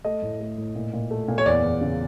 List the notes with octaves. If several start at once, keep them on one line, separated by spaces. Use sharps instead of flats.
A3 D#5
A2
A3
A2
A#2
A#2
A3
A#2
C#5
E2 D5
E2
C#3